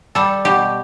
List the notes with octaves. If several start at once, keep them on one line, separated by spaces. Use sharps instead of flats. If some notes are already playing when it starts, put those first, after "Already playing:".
G3 A4
B2 G4